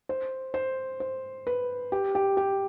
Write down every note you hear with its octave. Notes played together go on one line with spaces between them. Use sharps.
C5
C5
C5
B4
G4
G4
G4